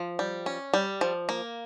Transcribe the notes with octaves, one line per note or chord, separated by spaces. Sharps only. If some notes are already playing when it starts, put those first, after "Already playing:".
Already playing: F3
G3
C#4
G3
F3
A#3